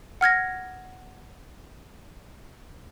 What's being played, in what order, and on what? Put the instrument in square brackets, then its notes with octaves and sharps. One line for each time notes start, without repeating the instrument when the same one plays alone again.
[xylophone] F#5 F6 G#6 A#6